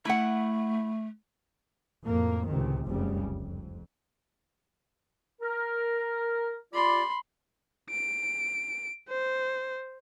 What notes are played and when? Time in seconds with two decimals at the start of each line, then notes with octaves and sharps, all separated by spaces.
0.05 A3 E4 F#5
2.03 F2 A2 A#3
2.48 C#2 A2 C3 D#3
2.86 F1 C#2 F#2 C#3 G3
3.39 F2
5.41 A#4
6.73 F4 G4 D5 B5 C6
7.90 D7
9.09 C5